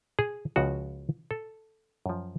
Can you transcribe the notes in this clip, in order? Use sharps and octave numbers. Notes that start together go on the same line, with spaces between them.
G#4
C#2 C#3 F3 F#4
A4
F#2 F3